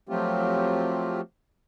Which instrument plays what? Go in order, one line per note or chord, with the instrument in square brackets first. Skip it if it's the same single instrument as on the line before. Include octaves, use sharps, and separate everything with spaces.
[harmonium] F3 F#3 A3 C4 F4 G4